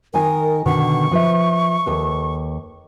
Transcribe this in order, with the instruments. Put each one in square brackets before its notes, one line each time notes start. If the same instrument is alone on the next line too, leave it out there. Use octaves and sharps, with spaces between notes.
[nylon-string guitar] D#3 D#4 G#5 [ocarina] A#4
[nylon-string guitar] B2 D3 D#3 [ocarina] C#6
[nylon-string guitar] F3 B4 E5
D#2 A4 B4